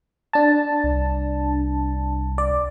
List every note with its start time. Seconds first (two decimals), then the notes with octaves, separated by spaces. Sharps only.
0.33 D4 A5
0.84 C2
2.38 D5